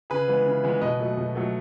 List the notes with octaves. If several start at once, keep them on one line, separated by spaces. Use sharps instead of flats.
C#3 G#4 B4
E3 G#3 B3
C#3
E3 G#3 B3
B2 B4 D#5
F#3 A3
B2
F#3 A3